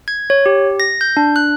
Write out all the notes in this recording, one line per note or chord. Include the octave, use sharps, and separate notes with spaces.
G#6
C#5
G4
A#6
G6
D4
F#6